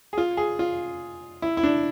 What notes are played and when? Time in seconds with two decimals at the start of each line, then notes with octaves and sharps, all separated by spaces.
0.13 G#4
0.18 F4
0.37 G#4
0.59 F4
1.42 E4
1.57 E4
1.63 D4